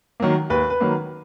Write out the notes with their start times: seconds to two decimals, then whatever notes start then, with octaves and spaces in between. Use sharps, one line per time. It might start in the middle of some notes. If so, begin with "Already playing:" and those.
0.20 D#3 F#3 A#3
0.50 D#2 B4
0.70 B4
0.81 D#3 F#3 A#3